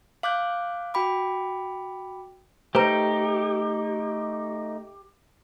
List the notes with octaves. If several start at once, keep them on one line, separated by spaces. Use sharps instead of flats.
F5 D6 F#6 G6
F#4 G5 B5 D6
A3 D#4 G4 B4 C5 A#5